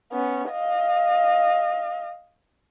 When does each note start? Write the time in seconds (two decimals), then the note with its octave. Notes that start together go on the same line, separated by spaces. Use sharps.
0.12 B3 C#4
0.51 D#5 F5